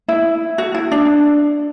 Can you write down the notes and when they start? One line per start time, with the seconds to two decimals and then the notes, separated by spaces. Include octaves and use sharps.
0.08 E4
0.58 F#4
0.75 E4
0.92 D4